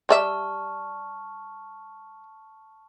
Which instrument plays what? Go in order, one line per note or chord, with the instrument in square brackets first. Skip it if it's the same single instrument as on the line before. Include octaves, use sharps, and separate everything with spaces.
[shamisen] G3 D5 E5 [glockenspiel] A5 C#6 F6